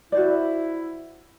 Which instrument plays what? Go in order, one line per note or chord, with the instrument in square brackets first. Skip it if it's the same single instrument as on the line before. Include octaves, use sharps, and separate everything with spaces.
[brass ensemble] E4 [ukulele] F#4 C5 D5